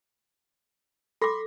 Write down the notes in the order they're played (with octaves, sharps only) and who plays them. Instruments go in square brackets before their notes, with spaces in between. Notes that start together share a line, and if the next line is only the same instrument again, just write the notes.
[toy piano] A4 D6 [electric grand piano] B5 C6 A#6